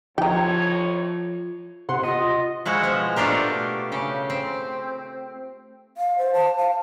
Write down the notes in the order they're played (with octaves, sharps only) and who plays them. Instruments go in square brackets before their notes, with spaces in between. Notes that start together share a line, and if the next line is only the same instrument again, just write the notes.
[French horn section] F2 A2 C#5 [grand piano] F3 [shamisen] G5 A#5
[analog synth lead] C3 [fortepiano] F#5 C6
[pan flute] F4 [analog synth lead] D#5
[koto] F3 G#3 E4 F#4
B2 F3 G#3
B2 A3 D4 F4 G4 A#4
C#3 G4
C4
[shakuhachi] F5
C5
A5
F5